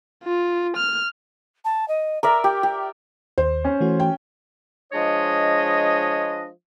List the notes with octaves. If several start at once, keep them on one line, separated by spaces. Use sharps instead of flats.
F4
F6
A5
D#5
A#4 D5 E5 A#5
G4 G5
G4
D#2 C5
C#4
E3 A3 F#4
G5
F3 G#3 D4 C#5 D#5